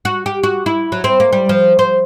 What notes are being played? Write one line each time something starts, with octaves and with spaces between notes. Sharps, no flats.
F#4
G4
F#4
E4
F#3
C4
A#3
G3
F3
C5